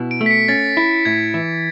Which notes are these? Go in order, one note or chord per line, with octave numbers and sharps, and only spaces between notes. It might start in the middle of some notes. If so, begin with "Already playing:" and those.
Already playing: B2 E4
D7
A3
B6
C#7
C#4 A6
E4
A2 G#6
E3